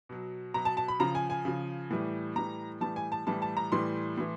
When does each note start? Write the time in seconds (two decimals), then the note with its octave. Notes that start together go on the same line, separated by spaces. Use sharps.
0.09 B2 F#3
0.54 B2 F#3 A#5
0.65 A5
0.77 A5
0.88 B5
1.00 C#3 F3 A#5
1.15 G#5
1.30 G#5
1.45 C#3 F3
1.90 A2 E3 G3
2.36 A2 E3 G3 A#5
2.81 A2 E3 G3 A5
2.96 G#5
3.12 A5
3.27 A2 E3 G3 A5
3.42 A5
3.57 A#5
3.72 A2 E3 G3 C6
4.17 A2 E3